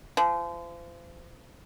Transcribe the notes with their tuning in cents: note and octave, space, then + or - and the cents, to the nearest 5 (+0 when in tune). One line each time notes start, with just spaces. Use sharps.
F3 -35